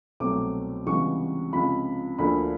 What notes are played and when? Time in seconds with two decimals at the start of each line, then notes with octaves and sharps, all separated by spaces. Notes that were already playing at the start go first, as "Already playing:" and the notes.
0.20 C2 B2 F#3 A3 C4 D6
0.86 C#2 C3 E3 G3 B3 C#6
1.53 C#2 C3 F3 B5
2.19 D2 D3 F3 A#3 B5